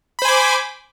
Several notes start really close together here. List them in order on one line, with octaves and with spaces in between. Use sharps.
B5 C5 G#5 D6